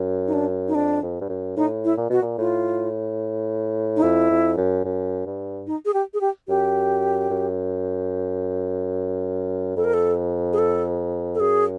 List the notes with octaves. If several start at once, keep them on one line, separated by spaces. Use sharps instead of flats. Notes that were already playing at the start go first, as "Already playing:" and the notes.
Already playing: F#2
D#4
D4
D#4
F2 D4
F2
G2
F#2
A2 D#4
E4
A#2
B2 F#4
A#2
A2 F4
D#4
F2 E4
F2
F#2
F#2
G2
D#4
G#4
G4
G#4
G4
F#2 G4
F#2
F2 A4
A#4
A4
G#4
A4
A4
F#2 G#4